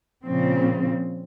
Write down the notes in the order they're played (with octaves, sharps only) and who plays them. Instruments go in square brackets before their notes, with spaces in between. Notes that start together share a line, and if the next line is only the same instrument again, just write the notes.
[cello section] A#2 C#3 F3 C4